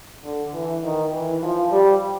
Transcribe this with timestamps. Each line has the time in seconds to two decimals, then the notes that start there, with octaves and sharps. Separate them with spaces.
0.24 D3
0.53 E3
0.83 D#3
1.12 E3
1.42 F3
1.71 G3